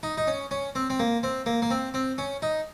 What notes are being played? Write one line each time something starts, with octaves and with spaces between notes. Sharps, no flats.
D#4
D#4
C#4
C#4
C4
C4
A#3
C4
A#3
A#3
C4
C4
C#4
D#4